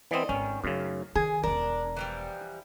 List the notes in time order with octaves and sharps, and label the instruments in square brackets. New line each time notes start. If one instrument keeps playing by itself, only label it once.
[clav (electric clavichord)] E3 B3 C4 [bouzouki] D5 D#5
[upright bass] G#1 [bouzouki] D#3 [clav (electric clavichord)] C#4
[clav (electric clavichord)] F#2 C#3 [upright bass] A3
[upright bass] D#3 [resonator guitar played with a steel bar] G#4 [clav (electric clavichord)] G#5
[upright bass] E1 C#4 [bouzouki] D4 [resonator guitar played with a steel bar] A#4
[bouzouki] E3 F3 G3